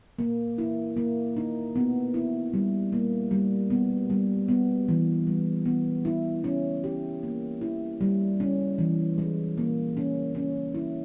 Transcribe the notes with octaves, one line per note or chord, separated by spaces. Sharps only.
A#3
E4
A#3
D#4
B3
E4
G3
A#3
G3
B3
G3
B3
E3
G3
B3
E4
C#4
G4
A#3
E4
G3
C#4
E3
G#3
A#3
C#4
C#4
E4